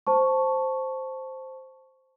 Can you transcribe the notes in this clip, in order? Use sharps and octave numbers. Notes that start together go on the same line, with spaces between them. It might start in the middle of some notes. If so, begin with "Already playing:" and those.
C5 A5 C#6